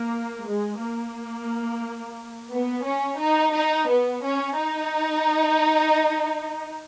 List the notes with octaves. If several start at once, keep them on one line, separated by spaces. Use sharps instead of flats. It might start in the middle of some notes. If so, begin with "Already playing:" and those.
Already playing: A#3
G#3
A#3
B3
C#4
D#4
D#4
B3
C#4
D#4